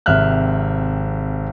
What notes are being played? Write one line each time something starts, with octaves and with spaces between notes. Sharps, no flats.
G#1 C3 E5 F6 F#6